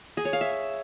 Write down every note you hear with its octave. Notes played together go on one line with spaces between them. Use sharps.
G#4
C#5
F5
E5